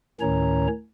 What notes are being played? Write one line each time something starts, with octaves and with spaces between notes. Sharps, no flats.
D2 A2 D#3 C#4 C#5 A#5